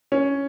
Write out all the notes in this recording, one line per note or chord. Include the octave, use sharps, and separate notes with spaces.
C#4